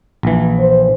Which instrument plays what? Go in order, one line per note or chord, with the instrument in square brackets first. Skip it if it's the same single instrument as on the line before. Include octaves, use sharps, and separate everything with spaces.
[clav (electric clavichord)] A#1 E3
[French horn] C5